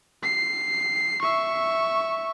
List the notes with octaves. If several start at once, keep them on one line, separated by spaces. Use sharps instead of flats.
C7
E5 C#6